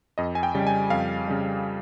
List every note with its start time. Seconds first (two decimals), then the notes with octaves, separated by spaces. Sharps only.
0.18 F2 D#5
0.35 G#5
0.43 G5
0.55 C#3 G3
0.67 G#5
0.90 F2 F5
1.27 C#3 G3